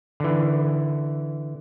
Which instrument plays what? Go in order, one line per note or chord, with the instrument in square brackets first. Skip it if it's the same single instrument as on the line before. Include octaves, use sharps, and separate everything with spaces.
[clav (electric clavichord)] D3 E3